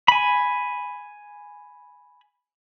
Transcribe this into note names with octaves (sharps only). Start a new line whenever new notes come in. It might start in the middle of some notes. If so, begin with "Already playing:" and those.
G#5 B5